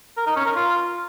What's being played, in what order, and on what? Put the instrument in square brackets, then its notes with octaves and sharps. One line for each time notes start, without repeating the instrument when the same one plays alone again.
[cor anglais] A#4
D#4
C#4
A#4
F4